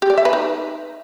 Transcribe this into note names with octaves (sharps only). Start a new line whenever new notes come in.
G4
D5
E5
B4
D#4